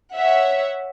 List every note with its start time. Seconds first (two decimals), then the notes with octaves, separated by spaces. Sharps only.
0.15 C#5 E5 F#5